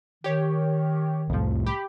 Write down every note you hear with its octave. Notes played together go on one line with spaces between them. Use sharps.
D#3 G4 C#5
C2 F2 A2 F3
G4 B5